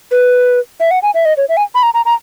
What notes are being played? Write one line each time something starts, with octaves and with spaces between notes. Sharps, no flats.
B4
E5
F#5
G#5
E5
D#5
C#5
E5
G#5
B5
A#5
A#5
A#5